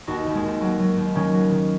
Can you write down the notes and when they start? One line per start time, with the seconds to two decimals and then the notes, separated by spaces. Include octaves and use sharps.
0.07 D#2 D#4 F#4
0.26 D#2
0.35 G#3
0.44 D#2
0.61 F#3 A#3
0.79 F#3
0.97 D#2
1.14 D#3 A#3 C#4
1.32 F#3
1.51 D#3